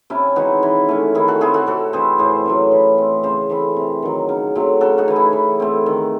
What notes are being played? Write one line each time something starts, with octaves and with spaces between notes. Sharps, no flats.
C3 C#4 E4
E3 G#3 D#4 F#4
E3
A3 C#4
D#3 E4 G#4
F#4 A4
A3 C4 E4 G#4
F#4 A4
C3 F#4 A4
E3 C4 G#4 C5
A2 G#4 C5
F#3 A3 C#4
E3
C4
C#3 G#4 C5
E3 A3 C4
C3
D#3 F#3
C#3
F#3 A3 C4
C#3 F#4 A4
D#4 F#4
E3 A3
E4 G#4
E3
A3 C4
D#3